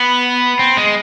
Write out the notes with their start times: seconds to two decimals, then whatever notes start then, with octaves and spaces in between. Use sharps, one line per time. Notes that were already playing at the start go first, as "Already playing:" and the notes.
Already playing: B3
0.59 C4
0.77 G#3